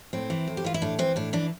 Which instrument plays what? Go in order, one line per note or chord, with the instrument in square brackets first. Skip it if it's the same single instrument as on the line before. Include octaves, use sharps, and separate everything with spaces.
[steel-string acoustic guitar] A2 C4
E3
A2
G4
E3 F4
E4
A2 D4
E3 C4
A2 D4
E3 D4